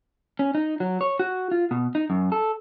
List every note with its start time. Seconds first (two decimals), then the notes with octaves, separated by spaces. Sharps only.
0.39 C#4
0.55 D#4
0.80 F#3
1.01 C#5
1.19 F#4
1.52 F4
1.71 B2
1.95 D#4
2.10 F#2
2.32 A4